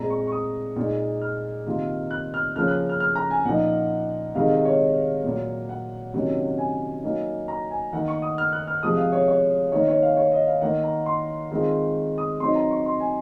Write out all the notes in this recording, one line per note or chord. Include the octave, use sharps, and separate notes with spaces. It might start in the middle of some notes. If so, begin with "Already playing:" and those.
Already playing: A#2 G#3 C4 A#5
C#6
C#6
D#6
A#2 G#3 D#4
F6
C3 D#3 A#3 F4
F#6
F6
C#3 F3 A#3 C#4 F4 F6
F#6
F6
F6
A#5
G#5
A#2 F3 A#3 D#4 F#5
C3 D#3 G#3 D#4 F5
D#5
C#5
A#2 F#3 A#3
F#5
C3 D#3 F#3 A#3 C#4
G#5
F#3 A#3 D#4
A#5
G#5
D#3 A#3 D#4 F#5
C#6
D#6
F6
F#6
F6
C3 F3 G#3 D#6
F5
C#5
C#5
D#3 A#3 D#4 C#5
C#5
F5
C#5
D#5
F5
D#3 A#3 D#4 F#5
A#5
C6
D#3 G#3 C4 F4
D#6
F#3 C4 D#4 C6
A#5
C#6
C6
G#5